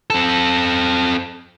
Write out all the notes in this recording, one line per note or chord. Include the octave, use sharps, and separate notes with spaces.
C4 A4